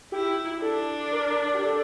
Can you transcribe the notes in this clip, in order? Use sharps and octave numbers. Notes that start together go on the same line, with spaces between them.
E4 G4
D4 A4
A#4
G4
A4